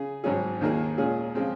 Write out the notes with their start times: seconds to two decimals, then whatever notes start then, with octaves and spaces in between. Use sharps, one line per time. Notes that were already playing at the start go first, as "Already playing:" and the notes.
Already playing: C#3 G#4
0.24 G#1 G#2 F#3 C#4 G#4
0.61 D#2 D#3 A#3 D#4 G#4
0.98 A#2 G#3 C#4 G#4
1.35 C#3 F3 G#3 C4